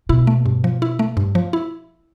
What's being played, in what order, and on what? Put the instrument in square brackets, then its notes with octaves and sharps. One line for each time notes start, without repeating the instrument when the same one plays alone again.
[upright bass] B2 [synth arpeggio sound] E4
[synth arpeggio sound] A3
G2
F3
E4
A3
G2
F3
E4